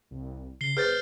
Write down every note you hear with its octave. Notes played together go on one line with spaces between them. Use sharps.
C2
C#3 C7 G7
G1 G#4 B4 C5 F6 G6 A6